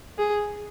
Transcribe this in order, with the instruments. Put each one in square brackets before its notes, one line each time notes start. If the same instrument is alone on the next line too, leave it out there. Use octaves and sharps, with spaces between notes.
[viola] G#4